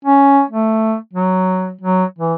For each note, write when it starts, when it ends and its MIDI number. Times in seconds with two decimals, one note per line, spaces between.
0.05 0.42 61
0.50 0.95 57
1.13 1.73 54
1.81 2.04 54
2.19 2.35 52